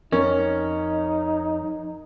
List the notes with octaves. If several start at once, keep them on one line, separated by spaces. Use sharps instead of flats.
F2 C#4 D#4 A#4